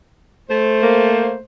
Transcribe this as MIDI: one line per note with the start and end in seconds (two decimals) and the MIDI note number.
0.50 1.42 57
0.50 1.42 72
0.83 1.35 58